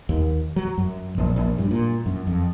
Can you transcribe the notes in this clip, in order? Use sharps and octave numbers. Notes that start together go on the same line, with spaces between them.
D#2
F#3
F#2
A#1
A#1
G2
A#2
F#2
F2